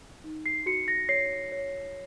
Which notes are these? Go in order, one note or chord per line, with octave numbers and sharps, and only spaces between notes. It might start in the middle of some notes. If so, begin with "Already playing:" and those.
D#4
C7
F#4 C#7
A#6
C#5 C7
C#5